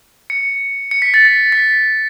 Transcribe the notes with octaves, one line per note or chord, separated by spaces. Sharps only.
C#7
C#7
B6
A6
B6
B6